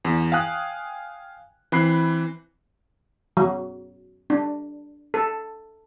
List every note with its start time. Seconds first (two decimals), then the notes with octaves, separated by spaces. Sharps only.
0.05 E2
0.32 F5 G5 G#5 D#6 F#6
1.72 E3 C4 B5 F#6 C7
3.37 F#3
4.30 D4
5.14 A4